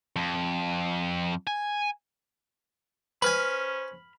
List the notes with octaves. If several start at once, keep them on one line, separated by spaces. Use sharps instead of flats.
F2
G#5
C#4 B4 C5 G#5 B5 F6